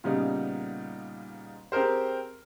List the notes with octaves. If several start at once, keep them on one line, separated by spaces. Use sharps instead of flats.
A#2 C#3 G3 B3 D#4
C4 G4 G#4 A#4 C5